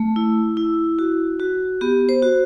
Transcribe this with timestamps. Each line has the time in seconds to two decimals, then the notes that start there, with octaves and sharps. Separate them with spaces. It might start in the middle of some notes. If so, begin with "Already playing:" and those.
Already playing: A3
0.16 E4
0.57 E4
0.99 F#4
1.40 F#4
1.81 B3 G4
2.09 C5
2.22 F#4